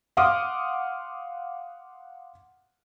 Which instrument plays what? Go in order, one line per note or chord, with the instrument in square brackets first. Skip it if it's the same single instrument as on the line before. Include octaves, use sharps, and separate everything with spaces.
[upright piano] F5 F#5 C6 D6 D#6 F6